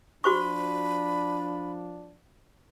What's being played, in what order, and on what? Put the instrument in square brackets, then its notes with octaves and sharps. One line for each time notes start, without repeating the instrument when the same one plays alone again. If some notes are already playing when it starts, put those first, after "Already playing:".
[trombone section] F3 D4 [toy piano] F#4 C5 C#6 [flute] B5